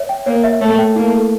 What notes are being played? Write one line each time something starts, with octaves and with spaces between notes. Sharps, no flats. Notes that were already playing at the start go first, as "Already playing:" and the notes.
Already playing: C#5 E5
G5
A#3 C#5
E5
A3 C#5
G5
A#3 E4
A4